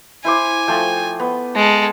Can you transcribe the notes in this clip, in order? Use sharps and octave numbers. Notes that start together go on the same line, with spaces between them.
E4 C5 G#5 D6
F3 A3 G5
B3
G#3 A4